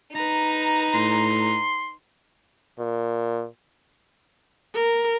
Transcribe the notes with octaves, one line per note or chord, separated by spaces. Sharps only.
D#4 B4 A#5
A2 C6
A#2
A#4